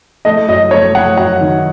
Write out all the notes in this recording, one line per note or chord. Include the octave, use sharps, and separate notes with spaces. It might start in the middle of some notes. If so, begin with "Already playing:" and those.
A3 D#5
F#2 D#5
A3 C#5
A3 F#5
F#2 F#5
D#3